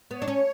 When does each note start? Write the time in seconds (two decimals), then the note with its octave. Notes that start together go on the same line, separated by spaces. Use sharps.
0.10 B3 C#5
0.22 D4
0.28 C#4